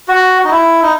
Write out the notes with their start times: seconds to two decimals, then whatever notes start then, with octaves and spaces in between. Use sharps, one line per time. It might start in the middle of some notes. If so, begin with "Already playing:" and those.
0.08 F#4
0.44 D#4
0.51 E4
0.82 D#4